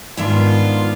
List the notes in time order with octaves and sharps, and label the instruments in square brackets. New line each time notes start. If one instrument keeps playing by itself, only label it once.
[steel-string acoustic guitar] G#2 D#3 E5 [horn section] B3 D4 F4